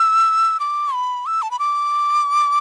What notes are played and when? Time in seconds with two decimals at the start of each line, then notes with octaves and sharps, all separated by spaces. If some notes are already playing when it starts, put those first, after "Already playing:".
Already playing: E6
0.60 D6
0.94 B5
1.26 E6
1.42 A5
1.51 B5
1.59 D6